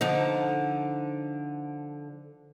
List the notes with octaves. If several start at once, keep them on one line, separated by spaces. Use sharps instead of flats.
D3 F3 D#4